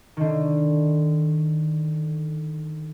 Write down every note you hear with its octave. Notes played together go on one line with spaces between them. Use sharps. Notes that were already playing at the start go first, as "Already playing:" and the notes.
D3 D#3